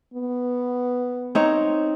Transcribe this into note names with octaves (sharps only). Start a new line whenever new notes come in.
B3
C4 D#4 C#5